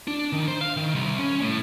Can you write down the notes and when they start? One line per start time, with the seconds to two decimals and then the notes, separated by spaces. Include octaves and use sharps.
0.08 D4
0.33 D#3
0.48 C5
0.61 F5
0.77 D#3
0.95 C2
1.19 C#4
1.42 A2